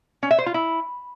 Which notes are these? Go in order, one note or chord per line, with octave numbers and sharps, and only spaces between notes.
C#4
E5
C5
F4
E4